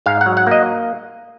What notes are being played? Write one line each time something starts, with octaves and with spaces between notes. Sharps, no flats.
G#2 F5
F#5
F#3
F#5
A#3 D#5